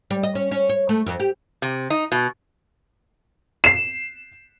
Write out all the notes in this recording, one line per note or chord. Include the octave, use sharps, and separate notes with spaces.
G3
D#5
C#4
C#4
C#5
A3
F2
G4
C3
D#4
B2
C7 E7